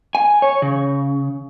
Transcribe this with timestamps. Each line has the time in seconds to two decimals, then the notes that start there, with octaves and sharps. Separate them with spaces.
0.15 G#5
0.42 C#5
0.62 C#3